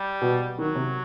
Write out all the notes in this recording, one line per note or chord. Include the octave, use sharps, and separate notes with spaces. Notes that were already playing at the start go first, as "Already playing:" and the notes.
Already playing: G3
B2
D#3 F#3
C3